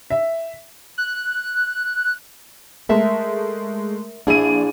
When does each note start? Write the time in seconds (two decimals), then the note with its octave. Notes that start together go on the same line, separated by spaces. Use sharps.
0.10 E5
0.98 F#6
2.89 G#3 A3 A#4 E5 A5
4.27 A#1 D4 E4 G#4 D#7